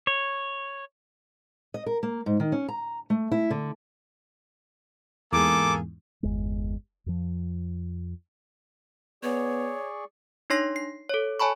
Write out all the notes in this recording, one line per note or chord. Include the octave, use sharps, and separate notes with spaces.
C#5
D#5
A#4
A#3
G#2
D#3
C#4
A#5
A3
E4
D3
E2 G#2 A#3 G#4 A4 D6
G1 E2 G#3
F2 F3
B3 G#4 C#5 D5 C#6
D4 D#4 C#5 C6 A#6 C7
C7
A4 C#5
C#5 G#5 A5 B5 C#6